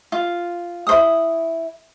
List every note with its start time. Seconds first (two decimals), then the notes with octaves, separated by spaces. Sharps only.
0.12 F4
0.87 E4 C5 D#6